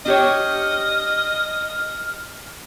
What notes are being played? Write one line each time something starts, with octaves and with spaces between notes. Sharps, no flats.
D4 G4 C#5 D#5 F6